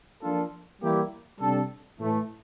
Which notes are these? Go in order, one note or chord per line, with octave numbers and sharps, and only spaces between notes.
F3 A#3 D4 F4 A4
E3 G3 A#3 E4 G4
C3 G3 D4 A4
A2 E3 A3